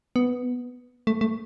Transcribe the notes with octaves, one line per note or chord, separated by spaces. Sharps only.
B3
A3
A3